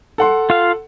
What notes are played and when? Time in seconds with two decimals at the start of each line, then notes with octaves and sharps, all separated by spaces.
0.18 A4 F#5 C6
0.50 F4 F5